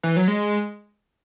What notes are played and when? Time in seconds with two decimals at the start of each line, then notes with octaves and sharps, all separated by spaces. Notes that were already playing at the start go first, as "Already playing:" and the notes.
0.03 E3
0.17 F#3
0.28 G#3